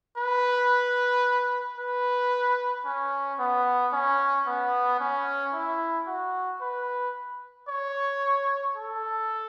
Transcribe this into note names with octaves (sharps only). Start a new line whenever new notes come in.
B4
B4
C#4
B3
C#4
B3
C#4
E4
F#4
B4
C#5
A4